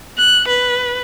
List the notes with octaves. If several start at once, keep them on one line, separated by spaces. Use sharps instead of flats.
F#6
B4